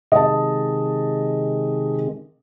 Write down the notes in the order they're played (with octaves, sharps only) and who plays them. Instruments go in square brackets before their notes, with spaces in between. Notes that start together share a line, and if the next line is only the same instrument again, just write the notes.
[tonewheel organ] C3 D#3 G#3 [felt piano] D#5 A5